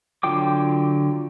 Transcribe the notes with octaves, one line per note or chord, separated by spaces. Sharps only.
D3 F#3 F4 G5 D6